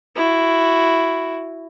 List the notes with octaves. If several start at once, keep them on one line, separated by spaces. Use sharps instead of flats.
E4 F#4